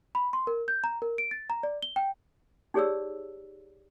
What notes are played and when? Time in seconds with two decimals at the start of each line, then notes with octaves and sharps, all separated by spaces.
0.15 B5
0.33 C6
0.47 A#4
0.68 G6
0.84 A#5
1.02 A#4
1.18 D7
1.31 A6
1.50 A#5
1.63 D5
1.82 G7
1.96 G5
2.74 D#4 G4 G#4 C#5 D5 E6